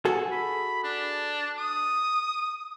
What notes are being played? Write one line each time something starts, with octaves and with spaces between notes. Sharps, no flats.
F#4 G#4 A4
B5
D4
D#6